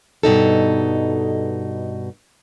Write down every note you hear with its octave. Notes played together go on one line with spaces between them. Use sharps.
G2 B2 D#4 A4